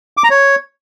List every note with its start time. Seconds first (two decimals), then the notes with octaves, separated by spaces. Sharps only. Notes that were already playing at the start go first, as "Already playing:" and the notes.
0.17 D6
0.24 A#5
0.30 C#5